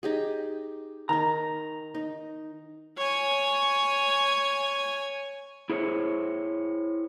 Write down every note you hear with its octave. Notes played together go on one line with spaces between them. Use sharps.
D#4 G4 G#4
D#3 D#4 A#5
D#4
C#5 G#5
E4 G#4 C5 C#5